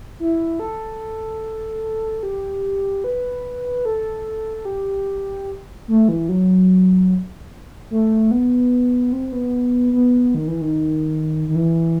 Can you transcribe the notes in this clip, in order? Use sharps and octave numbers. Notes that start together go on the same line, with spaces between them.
E4
A4
G4
B4
A4
G4
A3
E3
F#3
A3
B3
C4
B3
B3
D#3
E3
D#3
D#3
E3